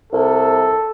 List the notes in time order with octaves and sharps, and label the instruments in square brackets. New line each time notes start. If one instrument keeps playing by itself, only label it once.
[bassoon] C2 [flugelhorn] A4